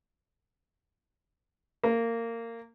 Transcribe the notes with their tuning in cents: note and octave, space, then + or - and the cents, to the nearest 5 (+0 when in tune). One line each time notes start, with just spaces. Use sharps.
A#3 -20